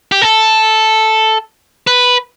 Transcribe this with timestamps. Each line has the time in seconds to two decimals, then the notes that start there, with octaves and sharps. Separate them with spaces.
0.12 G4
0.22 A4
1.87 B4